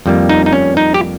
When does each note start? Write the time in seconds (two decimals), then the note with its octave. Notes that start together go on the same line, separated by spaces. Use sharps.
0.06 F2 D#3 G3 A#3
0.29 D#4
0.46 D#4
0.53 C#4
0.77 D#4
0.94 G4